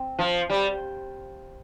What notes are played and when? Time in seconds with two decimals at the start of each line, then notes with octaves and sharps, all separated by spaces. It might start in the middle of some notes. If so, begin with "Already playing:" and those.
Already playing: C4
0.19 F3
0.50 G3